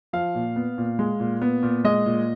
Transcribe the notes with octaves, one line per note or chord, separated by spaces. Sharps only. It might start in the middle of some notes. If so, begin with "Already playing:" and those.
F3 F5
A#2
B3
A#2
G#3
A#2
B3
A#2
G#3 D#5
A#2